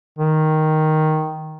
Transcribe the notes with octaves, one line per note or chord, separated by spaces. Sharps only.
D#3